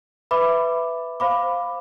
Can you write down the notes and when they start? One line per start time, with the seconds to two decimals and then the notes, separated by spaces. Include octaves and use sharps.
0.31 B4 E5 B5 D6
1.20 C5 F5 B5 D6